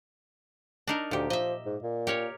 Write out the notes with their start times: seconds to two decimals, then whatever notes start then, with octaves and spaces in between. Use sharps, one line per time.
0.88 D4 D#4 A#4
1.11 D2 A#2 G4
1.30 F3 D#5 E5
1.66 G#2
1.83 A#2
2.07 G4 A#4 C#5